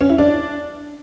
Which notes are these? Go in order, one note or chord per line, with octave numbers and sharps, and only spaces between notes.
C#4
E4
D4